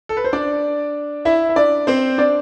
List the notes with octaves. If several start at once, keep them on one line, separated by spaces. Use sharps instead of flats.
A4
B4
C5
D4 D5
E4 E5
E5
D4 D5
C4 C5
D4 D5